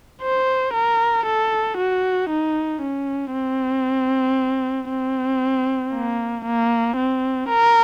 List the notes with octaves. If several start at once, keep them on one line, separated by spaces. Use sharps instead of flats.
C5
A#4
A4
F#4
D#4
C#4
C4
C4
A#3
A#3
C4
A#4